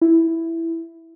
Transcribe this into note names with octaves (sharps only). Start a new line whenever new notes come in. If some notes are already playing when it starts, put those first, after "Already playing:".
E4